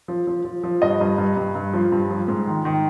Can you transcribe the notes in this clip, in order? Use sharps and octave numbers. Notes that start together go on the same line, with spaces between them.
F3
F3
F3
F3
G2 D#5
G2
G2
G2
G2
F3
G2
F3
G#2
D#3
D#3